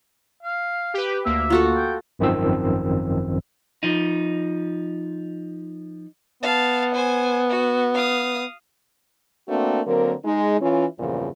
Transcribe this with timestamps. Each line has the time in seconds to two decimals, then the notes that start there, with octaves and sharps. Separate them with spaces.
0.43 F5
0.94 G4 B4
1.25 D2 A#3 E5
1.50 F4 F#4 A4
1.76 G5
2.19 G#1 F#2 D#3 F3 C4 E6
3.83 F3 D#4
6.42 B3 F5 A5
6.95 C5 G#5
7.50 F#4
7.94 F5 D#6
9.49 A3 A#3 C4 D4 F#4 A#4
9.87 D3 F#3 A#3 C4 A#4
10.25 G#3 D#4
10.61 E3 C#4 F4
10.99 E2 G2 A#2 C#3 F3